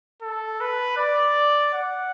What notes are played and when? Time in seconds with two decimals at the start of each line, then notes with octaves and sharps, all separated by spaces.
0.22 A4
0.61 B4
0.97 D5
1.74 F#5